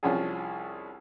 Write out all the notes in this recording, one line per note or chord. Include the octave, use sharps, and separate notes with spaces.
C2 F3 C#4 D4 G#4